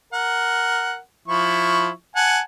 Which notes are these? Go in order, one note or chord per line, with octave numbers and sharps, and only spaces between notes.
A#4 F#5
F3 E4 C#6
F#5 G#5 A5